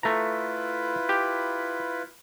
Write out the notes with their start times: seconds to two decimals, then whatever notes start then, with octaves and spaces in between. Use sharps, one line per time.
0.03 A3 E4 F4 B4 A#5
1.09 G4